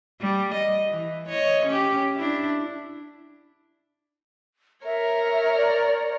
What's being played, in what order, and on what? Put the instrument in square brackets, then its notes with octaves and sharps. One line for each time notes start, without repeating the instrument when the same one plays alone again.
[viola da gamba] G3
D#5
E3
C#5 D#5
C#4 G4
D4 E4
[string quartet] A#4 C#5 [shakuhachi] E5
[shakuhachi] D5